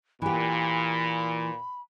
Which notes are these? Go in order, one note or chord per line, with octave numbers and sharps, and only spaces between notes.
A#2 E3 G4 B5